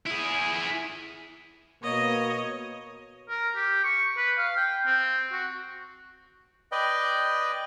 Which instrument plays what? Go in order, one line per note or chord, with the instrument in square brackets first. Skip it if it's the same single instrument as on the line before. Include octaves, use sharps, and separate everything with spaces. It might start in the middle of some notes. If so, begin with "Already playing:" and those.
[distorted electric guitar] E4 G#4
[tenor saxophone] B2 [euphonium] A#3 [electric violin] C#5 [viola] D#5
[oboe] A#4
G4
C#6
B4
F5
G5
C4
F#4
[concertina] B4 D5 D#5 G5